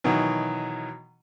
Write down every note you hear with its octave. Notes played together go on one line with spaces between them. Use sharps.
B2 D#3 E3 F#3